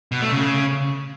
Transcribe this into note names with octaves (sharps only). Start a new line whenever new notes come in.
B2
A3
C#3